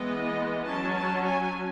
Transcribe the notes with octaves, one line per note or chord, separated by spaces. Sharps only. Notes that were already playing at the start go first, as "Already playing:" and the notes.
Already playing: E3 G#3 B3 D#5
F#3 C#4 A5
A5
G#5